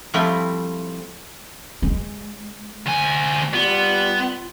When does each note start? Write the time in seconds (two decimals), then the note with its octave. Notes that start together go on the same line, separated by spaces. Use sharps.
0.14 F3 G3 A3 C4 E4 F4
1.82 G#3
2.86 D2 G#5
3.54 G3 B3 F4